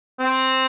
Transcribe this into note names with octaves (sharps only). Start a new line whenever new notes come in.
C4